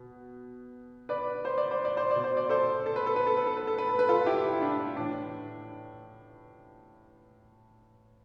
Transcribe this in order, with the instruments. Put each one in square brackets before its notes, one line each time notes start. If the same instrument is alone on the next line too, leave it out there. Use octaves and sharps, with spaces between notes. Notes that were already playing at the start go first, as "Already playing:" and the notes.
Already playing: [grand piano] B2
B4 D5
C5
D5
C5
D5
C5
B2 D5
C5
D5
A4 C5
A4
B4
A4
B4
A4
B4
A4
B4
A4
B4
A4
B4
F4 A4
E4 G4
E4
D4
A2 E3 D4